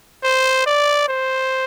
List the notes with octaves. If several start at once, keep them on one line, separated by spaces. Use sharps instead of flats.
C5
D5
C5